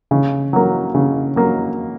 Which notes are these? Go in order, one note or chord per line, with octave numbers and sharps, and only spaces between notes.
C#3
F#3 A#3
C#3
F#3 A#3